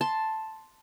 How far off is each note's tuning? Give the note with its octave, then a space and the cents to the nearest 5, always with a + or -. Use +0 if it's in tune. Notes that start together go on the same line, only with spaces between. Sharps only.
A5 +0 C6 +0